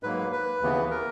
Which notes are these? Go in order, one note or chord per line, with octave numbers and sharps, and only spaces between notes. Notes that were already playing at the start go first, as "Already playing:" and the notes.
G#2 F#3 A#3 B4
B4
D#2 C#3 E3 B3
A#4